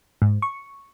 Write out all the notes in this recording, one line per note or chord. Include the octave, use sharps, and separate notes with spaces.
G#2
C#6